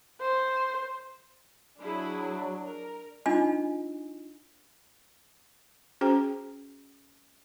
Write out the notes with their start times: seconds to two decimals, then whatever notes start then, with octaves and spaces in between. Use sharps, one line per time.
0.21 C5
1.80 F#3 D4 E4 G#4
2.66 A#4
3.26 D4 D#4 F4 D#5 G#5
6.01 C#4 F#4 G#4 C5 G5 A#5